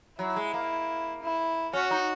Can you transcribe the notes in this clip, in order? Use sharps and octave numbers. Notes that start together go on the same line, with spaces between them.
F#3 E4
G#3
A#3
E4
C#4 F#4
D#4